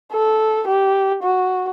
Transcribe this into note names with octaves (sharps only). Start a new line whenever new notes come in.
A4
G4
F#4